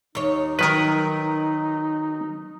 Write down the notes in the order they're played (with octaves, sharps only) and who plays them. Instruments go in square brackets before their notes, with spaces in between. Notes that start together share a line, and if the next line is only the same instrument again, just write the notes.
[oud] D#2 C#5 [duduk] D#4
[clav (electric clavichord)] D#3 B4 [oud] F#3 A#4